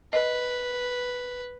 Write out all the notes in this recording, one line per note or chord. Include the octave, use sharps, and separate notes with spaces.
B4 D#5